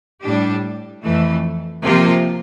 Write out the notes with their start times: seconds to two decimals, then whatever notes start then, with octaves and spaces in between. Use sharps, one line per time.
0.22 A2 G3 D4 G4
1.03 F2 E3 A3
1.82 C3 F3 A#3 F4